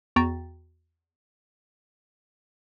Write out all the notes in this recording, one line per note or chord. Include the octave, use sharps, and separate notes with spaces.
E2 F#4 G5 A#5 A6